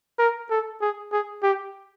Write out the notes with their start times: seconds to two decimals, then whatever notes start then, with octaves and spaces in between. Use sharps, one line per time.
0.19 A#4
0.50 A4
0.81 G#4
1.12 G#4
1.43 G4